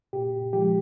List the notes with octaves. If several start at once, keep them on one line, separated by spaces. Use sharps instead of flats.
A#2 G4
F3 G#3 G4